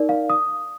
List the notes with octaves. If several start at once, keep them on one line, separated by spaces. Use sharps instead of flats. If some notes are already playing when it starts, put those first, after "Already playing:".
Already playing: D#4 A#4 D5
F5
D#6